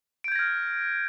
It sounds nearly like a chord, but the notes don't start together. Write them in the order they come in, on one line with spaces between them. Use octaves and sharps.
D7 G6 G#6 A#6 F6